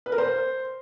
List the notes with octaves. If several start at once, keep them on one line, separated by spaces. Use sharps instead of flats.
B4
A#4
C5